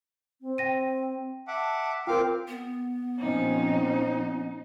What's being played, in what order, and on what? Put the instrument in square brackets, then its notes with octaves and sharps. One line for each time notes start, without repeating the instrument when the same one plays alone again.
[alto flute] C4
[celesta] G5 A#6 D#7
[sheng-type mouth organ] E5 F#5 D6 [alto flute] A5
[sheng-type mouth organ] C4 F5 D6 [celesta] F4 A#4 [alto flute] G5
[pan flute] B3
[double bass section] A#2 F3 C#4 [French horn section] C4 [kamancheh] D#4